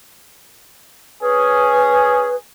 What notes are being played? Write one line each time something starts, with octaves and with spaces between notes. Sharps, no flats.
C#4 G#4 B4